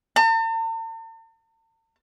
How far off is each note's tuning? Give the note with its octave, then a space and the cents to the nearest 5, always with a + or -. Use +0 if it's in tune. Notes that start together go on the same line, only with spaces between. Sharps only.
A5 +45